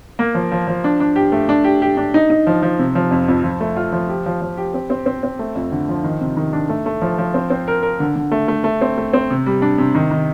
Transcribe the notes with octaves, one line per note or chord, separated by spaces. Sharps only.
A#3
F3
F3
F3
D4
D4
G4
A3
D4
G4
G4
D4
D#4
D#4
F3
F3
C3
F3
F2
F2
F3
A3
F4
F3
G4
F3
F3
G4
C4
C4
C4
C4
A3
F2
D3
F3
D#3
C3
D#3
D4
A3
A3
F3
F3
C4
C4
A#4
A#4
D3
D3
A3
A3
A3
C4
A3
C4
C3
G3
D4
C3
D#3
D#3